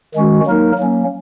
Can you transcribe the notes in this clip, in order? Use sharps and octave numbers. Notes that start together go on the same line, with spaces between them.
D#3 G#3 C#4 F#4
F#3 A#3 D#4 A#4
F#3 A#3 C#4